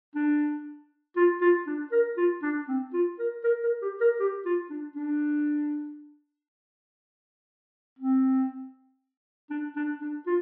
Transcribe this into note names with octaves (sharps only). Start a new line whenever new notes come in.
D4
F4
F4
D4
A#4
F4
D4
C4
F4
A#4
A#4
A#4
G4
A#4
G4
F4
D4
D4
C4
D4
D4
D4
F4